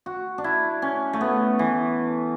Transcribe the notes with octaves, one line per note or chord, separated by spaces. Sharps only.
F#4
D4
E4
C#4
A3
B3
E3